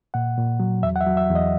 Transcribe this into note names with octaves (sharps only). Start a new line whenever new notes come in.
A#2 F#5
A#2
F#3
E2 E5
F#5
E5
F#3
E5
E2
D#5